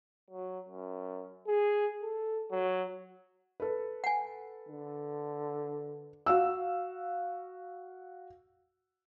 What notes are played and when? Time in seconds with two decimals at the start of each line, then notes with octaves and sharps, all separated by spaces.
0.30 F#3
0.68 F#2
1.47 G#4
2.02 A4
2.51 F#3
3.60 A4 B4
4.04 F#5 G#5
4.68 D3
6.26 F#4 F5 E6